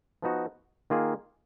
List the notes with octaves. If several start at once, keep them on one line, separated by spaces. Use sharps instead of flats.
F3 B3 D#4 F#4
D#3 A#3 F4 G#4